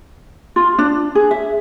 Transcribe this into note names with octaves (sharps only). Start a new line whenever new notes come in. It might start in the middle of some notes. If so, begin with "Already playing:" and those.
F4
D4
G#4
E5